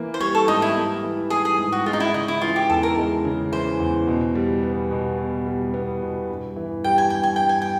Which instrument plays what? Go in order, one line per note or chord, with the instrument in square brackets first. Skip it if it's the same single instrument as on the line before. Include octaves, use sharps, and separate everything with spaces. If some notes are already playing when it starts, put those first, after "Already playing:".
Already playing: [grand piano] E3 A#3
[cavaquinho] C5
[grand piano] G3 [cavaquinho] C#5
[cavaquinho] A4
[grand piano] G#2 [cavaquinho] D#4
[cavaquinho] E4
[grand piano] A#3
E3
[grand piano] G3 [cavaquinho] G#4
[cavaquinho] G#4
[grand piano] G#2
[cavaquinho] F#4
[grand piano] G#3 [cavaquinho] F4
[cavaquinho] D#4
E4
[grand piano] C#3 [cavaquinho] D#4
[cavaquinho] E4
[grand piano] E3 [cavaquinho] F4
[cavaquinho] G4
[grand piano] E2 [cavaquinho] A4
[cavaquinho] A#4
[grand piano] G#3
C#3
[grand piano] E3 [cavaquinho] C5
[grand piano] E2
B2
G3
B3
B2
B2
G3
B3
B2
G2
E3
[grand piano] G3 [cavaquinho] G5
[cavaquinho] G#5
[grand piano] G2 [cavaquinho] G5
[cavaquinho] G#5
[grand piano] G2 [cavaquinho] G5
[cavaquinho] G#5
G5